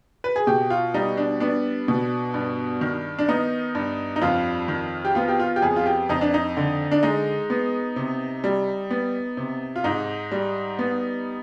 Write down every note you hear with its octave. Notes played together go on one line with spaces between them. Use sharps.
B4
G#4
B2 G4
F4
G3 D#4
D4
B3 D4
B2
G2
D#3
D4
B3 D#4
G2
D#4
F2 F4
D#3
G4
B3 F4
G4
F4
G4
F2 G#4
F4
G4
F2 D#4
D4
D#4
D3
D4
G#3 D#4
B3
C3
G3
B3
C3
F4
G#2 D#4
G3
B3